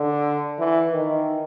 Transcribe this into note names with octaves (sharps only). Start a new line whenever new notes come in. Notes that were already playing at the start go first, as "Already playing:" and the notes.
Already playing: D3
E3
D#3